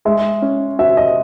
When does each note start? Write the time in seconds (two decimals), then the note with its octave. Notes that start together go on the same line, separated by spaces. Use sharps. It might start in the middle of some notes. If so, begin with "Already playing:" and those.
0.05 G#3 E5
0.42 C#4
0.79 F#4 E5
0.97 D#5